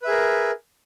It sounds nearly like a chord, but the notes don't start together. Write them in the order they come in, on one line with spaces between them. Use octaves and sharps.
B4 E5 G#4 A#4